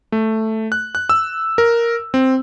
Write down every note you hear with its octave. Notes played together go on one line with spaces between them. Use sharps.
A3
F#6
F#6
E6
A#4
C4